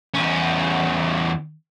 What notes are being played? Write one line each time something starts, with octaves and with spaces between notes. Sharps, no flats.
E2 C#4